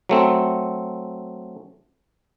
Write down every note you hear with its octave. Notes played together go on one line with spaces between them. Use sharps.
F#3 A3 C4